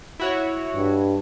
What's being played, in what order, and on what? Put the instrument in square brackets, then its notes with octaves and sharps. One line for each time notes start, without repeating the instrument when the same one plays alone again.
[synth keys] E4 F#4 C#5
[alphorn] G2